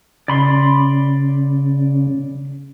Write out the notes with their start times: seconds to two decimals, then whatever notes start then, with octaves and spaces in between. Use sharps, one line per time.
0.28 C#3 D5 B5 C6